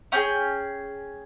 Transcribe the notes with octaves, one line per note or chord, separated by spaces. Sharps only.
C#4 G#4 G5